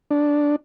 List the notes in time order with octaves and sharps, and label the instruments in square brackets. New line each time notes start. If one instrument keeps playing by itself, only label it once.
[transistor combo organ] D4